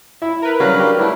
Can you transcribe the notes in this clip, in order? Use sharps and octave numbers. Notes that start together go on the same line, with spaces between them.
E4 E5
A#4 B4
C#3 F#3 G3 F#4 F5 B5
D4 G4
F#3 G3 A3 E4